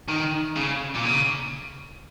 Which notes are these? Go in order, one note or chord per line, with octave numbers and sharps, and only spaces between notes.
D#3
C#3
A#2
C#3